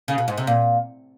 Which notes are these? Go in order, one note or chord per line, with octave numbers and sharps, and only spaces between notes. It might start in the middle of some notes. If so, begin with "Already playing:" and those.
C#3
B2
G#2
C3
A#2